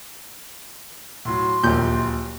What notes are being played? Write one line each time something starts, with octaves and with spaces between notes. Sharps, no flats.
A2 F#3 C6
D1 A#1 D#2 A#2 A#3 F4 G4 G6